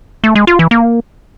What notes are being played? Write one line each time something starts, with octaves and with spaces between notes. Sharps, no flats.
A3
G#3
F4
E3
A#3